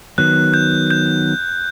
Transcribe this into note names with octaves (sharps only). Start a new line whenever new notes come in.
D#3 F#3 B3 F#6
G6
G6